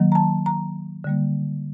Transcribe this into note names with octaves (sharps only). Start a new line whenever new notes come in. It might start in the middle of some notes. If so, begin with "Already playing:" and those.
Already playing: D#3 F#3 A#3
A#5
A5
A#5
D3 G3 A#3